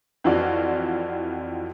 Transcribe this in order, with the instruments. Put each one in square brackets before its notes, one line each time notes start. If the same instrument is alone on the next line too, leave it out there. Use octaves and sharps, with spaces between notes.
[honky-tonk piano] F2 E3 F4 F#4 D5